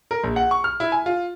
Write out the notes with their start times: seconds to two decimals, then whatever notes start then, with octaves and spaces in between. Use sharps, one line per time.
0.11 A#4
0.24 A#1
0.36 F#5
0.51 C#6
0.64 F6
0.80 E4
0.92 G#5
1.06 F4